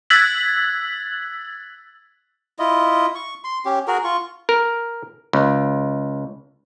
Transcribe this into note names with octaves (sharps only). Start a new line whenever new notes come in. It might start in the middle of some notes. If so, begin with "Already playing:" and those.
E6 F#6 G#6 A6 B6 F#7
E4 F4 D#5
C#6
C6
C#4 G4
F#4 G#4 A#4
F4 C#6
A#4
C#2